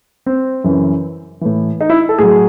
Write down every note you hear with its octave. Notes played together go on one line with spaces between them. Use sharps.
C4
F#2 C#3 E3
A2 E3
D#4
E4
A4
A2 F#3 G#4